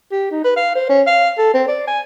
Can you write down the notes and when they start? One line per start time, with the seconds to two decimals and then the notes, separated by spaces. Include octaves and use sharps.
0.11 G4
0.31 D#4
0.44 B4
0.56 F5
0.75 C5
0.89 C#4
1.07 F5
1.38 A4
1.54 C4
1.68 D5
1.88 G#5